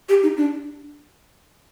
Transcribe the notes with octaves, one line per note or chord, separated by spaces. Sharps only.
G4
D#4
D4